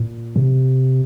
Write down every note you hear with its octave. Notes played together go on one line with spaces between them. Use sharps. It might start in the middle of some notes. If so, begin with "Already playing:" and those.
Already playing: A#2
C3